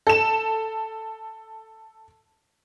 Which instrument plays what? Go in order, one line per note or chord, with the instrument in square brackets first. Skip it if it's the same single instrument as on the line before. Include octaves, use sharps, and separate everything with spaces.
[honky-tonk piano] A4 E7